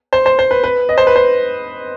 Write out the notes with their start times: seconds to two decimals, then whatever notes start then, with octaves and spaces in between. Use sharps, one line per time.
0.13 C5
0.26 C5
0.39 C5
0.51 B4
0.64 B4
0.89 D#5
0.98 C5
1.07 B4
1.16 C5